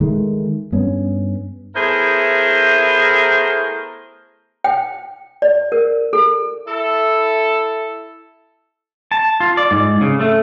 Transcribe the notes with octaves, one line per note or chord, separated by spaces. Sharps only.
D#3 G#3 A3
G2 B3 C#4
A3 B3 E4 G#4 A#4 C5
G5
D5
A#4
A4
E4 A4
A5
F4
D5
G#2
C#3
A3